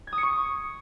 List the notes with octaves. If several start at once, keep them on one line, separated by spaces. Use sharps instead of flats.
G#6
D#6
C#7
C#6